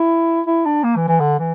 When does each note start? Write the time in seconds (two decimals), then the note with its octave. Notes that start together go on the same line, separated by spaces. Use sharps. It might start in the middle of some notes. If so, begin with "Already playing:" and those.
Already playing: E4
0.47 E4
0.66 D4
0.84 A#3
0.96 E3
1.08 E3
1.20 D3
1.39 E3